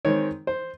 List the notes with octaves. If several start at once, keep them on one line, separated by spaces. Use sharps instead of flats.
D#3 G#3 C4 C#5
C5